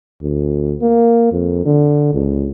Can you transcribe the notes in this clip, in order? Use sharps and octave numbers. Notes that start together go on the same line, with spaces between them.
D2
A#3
F2
D3
C#2